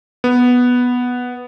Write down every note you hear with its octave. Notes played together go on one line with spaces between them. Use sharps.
B3